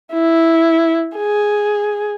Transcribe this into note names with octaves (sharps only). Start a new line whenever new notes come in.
E4
G#4